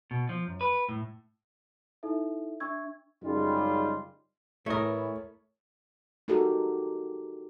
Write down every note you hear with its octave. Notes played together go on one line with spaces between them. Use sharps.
B2
F3
F#2
B4
A2
D#4 E4 A4 E5
D4 E5 C#6 E6 G#6
F#2 C#3 G3 G#3 D#4 F4
A2 E3 A3 E4 A#4 C#5 D#6
D#4 F#4 G4 A4 A#4